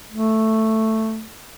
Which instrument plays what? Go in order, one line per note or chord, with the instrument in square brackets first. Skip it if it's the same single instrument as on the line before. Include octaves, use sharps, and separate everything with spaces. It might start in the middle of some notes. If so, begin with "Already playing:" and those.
[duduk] A3